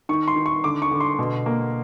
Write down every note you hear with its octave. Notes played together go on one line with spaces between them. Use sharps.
D#3 C#6
C6
D#3
C#6
D3 D6
C#6
D3
C6
B2
A#3